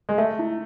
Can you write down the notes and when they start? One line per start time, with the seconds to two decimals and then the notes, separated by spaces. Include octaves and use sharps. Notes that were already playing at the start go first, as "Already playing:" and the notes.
0.09 G#3
0.18 A3 E5
0.39 E4